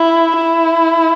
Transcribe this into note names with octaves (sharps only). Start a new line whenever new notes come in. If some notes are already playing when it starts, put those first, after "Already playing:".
Already playing: E4
E4